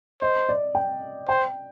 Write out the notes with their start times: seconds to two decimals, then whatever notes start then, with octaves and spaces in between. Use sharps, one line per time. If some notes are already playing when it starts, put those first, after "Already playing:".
0.21 C5 D#5
0.49 D5
0.75 G5
1.28 C5 G5